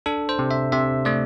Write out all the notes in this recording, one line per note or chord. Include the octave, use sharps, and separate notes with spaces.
D4 A4
C5
C3
E5
C3 E5
A3 D5